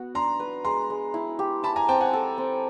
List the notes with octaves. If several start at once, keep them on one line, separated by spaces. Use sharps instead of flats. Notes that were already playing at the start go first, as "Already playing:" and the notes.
Already playing: B3 F#4
D4 A#5 C6
B4
G#3 A#5 C6
G#3
E4
G4
E4 A5 B5
G#5 A#5
C4 G5 A5
F#5 G#5
A4
C4